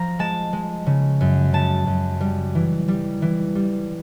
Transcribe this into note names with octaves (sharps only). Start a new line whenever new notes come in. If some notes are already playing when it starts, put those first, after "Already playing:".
Already playing: F3 A#5
G#3 A5
G#3
C#3
F#2
C#3 A5
F#2
G3
E3
G3
E3
G3